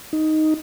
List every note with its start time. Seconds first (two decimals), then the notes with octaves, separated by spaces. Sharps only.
0.13 D#4